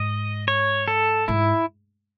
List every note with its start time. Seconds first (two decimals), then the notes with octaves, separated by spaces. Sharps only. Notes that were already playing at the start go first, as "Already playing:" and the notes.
Already playing: G#2 D#5
0.48 C#5
0.88 A4
1.28 G#2 E4